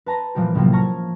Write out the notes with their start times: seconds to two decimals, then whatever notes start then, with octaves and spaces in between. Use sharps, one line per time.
0.06 B4 A5 A#5 C6
0.35 A#2 E3 F3 G3 G4
0.54 C2 A2 C3 F3 F#3 A#3
0.72 A5 A#5 C#6 F6 G#6